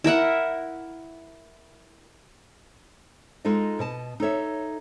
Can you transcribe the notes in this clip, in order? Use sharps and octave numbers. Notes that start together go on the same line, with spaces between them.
E4 A#4 E5 F#5
G#3 D#4 F4 A4 D#5
B2 D#5 A5
D#4 A4 C#5 E5